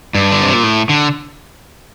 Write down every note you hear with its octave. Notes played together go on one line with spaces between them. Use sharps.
G2
D3
C3
A#2
A2
D3